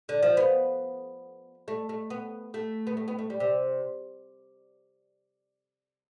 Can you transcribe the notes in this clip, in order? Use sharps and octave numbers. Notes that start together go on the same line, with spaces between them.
D3
F3
B3
A3
A3
B3
A3
B3
A3
B3
A3
G3
C3